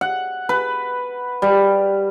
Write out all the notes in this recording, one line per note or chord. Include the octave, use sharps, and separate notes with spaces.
F#5
B4
G3